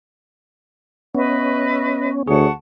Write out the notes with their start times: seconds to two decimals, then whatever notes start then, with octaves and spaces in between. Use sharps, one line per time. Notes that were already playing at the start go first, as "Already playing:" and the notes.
1.15 B3 C#4 B4 D#5 E5
2.27 D2 G#4 C#5 F#5 A5 C#6